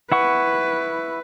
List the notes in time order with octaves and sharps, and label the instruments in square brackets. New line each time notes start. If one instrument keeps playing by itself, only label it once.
[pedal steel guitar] E4 F#5 C#6 [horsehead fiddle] B4